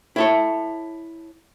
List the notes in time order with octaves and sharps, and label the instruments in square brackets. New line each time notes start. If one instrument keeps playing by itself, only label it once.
[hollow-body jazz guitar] E4 A4 C#5